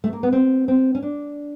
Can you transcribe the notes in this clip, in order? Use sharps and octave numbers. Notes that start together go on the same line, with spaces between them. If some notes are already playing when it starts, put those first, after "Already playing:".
A3
A#3
B3
C4
C4
C#4
D4